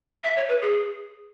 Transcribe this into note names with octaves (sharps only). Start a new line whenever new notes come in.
E5
C#5
B4
G#4